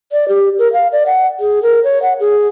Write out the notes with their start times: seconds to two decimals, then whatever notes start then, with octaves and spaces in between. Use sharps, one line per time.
0.12 D5
0.28 G4
0.59 A#4
0.73 F5
0.92 D5
1.06 F#5
1.40 G#4
1.63 A#4
1.84 C#5
2.02 F#5
2.20 G#4